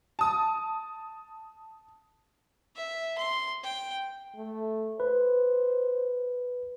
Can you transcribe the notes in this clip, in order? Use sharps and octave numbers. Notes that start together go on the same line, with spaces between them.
A5 D#6
E5
C6
G5
A3
B4 C5